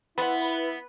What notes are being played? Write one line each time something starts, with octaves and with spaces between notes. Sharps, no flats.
B3 E4 B4 C5 F#5